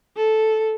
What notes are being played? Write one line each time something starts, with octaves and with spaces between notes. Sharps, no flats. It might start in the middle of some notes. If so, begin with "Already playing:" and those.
A4